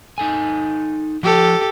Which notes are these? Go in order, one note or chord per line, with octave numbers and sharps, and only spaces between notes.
D#4 A4 G#5
F3 G4 A4 C#5